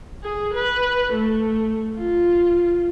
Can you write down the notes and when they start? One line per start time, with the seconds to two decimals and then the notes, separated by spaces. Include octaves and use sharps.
0.24 G#4
0.54 B4
1.14 A3
1.98 F4